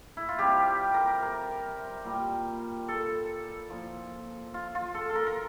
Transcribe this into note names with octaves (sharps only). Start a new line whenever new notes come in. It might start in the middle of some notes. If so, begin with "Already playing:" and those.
E4
F4
C3 G3 G4
A#4
A#4
A#2 G3
A4
A#2 F3
F4
F4
A4
A4
A#4
A#4